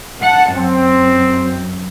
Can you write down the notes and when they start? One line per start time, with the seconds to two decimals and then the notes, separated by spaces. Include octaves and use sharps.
0.21 F#5 A5
0.55 F#2 C4